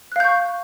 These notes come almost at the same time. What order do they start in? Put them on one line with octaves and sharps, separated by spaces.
F#6 F5 G6 C#6